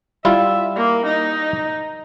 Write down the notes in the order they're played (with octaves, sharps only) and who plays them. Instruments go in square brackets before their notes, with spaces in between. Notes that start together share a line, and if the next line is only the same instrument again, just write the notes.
[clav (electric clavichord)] G3 E4 F4 [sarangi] E5
[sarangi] A#3
D#4